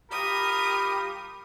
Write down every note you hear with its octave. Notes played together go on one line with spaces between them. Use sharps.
G3 F4 G4 A#4 B5 D#6